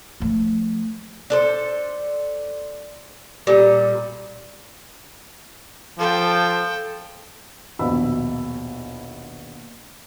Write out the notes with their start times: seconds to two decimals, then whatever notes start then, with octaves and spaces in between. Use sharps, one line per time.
0.20 F3 A3
1.30 D4 A4 C5
3.47 A#2 G3 A4
5.99 F3 A4 G5
7.79 A#1 D#2 B2 D#5 B5 E6